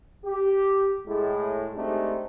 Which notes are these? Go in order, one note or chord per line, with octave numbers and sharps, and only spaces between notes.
G4
A2 G#3
G#3 A3 C4 D4 D#4 G4